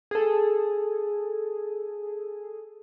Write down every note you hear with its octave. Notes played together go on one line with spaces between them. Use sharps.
G#4 A4